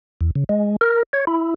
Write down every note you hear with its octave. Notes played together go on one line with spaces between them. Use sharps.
E2
C#3
G#3
A#4
C#5
E4